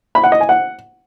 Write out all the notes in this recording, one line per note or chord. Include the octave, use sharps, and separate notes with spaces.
B5
F#5
D#5
G#5
F#5